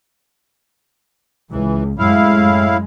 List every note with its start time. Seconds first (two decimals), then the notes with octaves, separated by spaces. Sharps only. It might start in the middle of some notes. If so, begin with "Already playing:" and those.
1.51 C#2 E3
1.99 F#2 A2 G#3 E4 F5